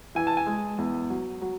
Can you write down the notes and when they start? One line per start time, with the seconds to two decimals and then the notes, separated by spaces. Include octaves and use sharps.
0.15 E3 G#5
0.27 A5
0.37 G#5
0.47 G#3
0.78 E2
1.10 F#3
1.41 F#3